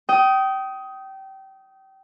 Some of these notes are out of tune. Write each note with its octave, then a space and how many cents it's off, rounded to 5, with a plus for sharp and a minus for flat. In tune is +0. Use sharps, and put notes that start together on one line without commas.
G5 -25 D#6 +15